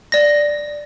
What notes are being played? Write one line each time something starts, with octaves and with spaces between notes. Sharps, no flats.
D5 A#6